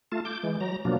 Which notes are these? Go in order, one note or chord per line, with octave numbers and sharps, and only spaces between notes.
A3 F4 A5
D6 G6
E3 G#3
F#3 A#5
B2 F3 F#3 A#3 D4